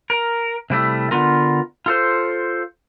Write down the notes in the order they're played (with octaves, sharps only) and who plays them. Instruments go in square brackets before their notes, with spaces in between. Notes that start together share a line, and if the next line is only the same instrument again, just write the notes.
[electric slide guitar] A#4
C3 G3 A3 E4
D3 B3 F4 A#4
F4 A4 C5